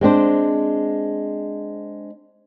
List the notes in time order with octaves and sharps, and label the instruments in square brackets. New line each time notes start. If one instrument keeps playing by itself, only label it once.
[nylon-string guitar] G#3 C4 D4 C5